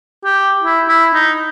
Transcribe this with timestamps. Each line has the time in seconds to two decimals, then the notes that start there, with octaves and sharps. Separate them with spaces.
0.24 G4
0.63 E4
0.88 E4
1.14 D#4